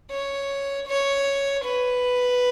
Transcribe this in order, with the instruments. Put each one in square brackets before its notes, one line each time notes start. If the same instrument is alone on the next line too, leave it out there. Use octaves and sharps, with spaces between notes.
[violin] C#5
C#5
B4